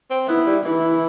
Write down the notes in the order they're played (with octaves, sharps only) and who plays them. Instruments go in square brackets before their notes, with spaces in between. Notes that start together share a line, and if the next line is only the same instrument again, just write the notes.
[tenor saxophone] C4
[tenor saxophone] B3 [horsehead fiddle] E4
[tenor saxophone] G3
[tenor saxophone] E3 [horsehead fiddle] E4